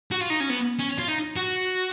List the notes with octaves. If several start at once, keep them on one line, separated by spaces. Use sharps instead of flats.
F#4
F4
D#4
C#4
B3
C#4
F4
D#4
F#4